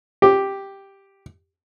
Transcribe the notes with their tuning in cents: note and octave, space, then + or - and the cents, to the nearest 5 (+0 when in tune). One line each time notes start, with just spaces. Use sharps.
G4 +0